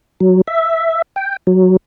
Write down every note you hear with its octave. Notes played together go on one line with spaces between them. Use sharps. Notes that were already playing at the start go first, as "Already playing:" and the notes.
F#3
E5
G5
F#3